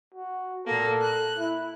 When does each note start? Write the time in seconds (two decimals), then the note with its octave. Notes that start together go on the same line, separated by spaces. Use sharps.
0.14 F#4
0.67 A#2 A#3 A4
1.01 F#6
1.39 E4